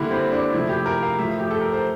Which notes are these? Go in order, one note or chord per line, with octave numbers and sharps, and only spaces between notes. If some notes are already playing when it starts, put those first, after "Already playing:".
Already playing: D3 G3 A#3 E4
C4
D4
C3 F3 A3 E4
G4
A#4
F5
A2 F3 A3 E5
G4
A4
A#4
C5